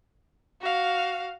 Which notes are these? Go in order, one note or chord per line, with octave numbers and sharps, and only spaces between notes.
F#4 F5